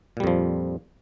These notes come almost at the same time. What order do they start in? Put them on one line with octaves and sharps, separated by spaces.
A#2 G3 F2 F3